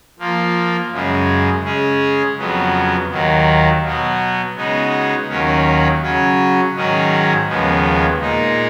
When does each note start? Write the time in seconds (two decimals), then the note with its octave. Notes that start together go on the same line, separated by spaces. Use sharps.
0.19 F3 A#3 F4
0.91 F#2 C#3 G#3
1.64 C#3 G#3 C#4 G#4
2.37 F2 C#3 F#3 B3
3.10 D#2 D#3 F#3
3.83 B2 F#3 B3
4.56 C#3 G#3 B3 D#4 F#4
5.29 D#2 D#3 F#3 C#4
6.02 C#3 F#3 C#4 F#4
6.75 G#2 D#3 F#3 C#4 G#4
7.48 D#2 C#3 F3 G#3 B3
8.21 A#2 G#3 D#4